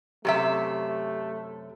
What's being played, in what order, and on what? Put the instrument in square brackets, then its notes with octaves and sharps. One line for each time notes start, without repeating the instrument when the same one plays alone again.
[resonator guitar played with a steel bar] F#2 C3 E5 [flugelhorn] A3 [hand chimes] G4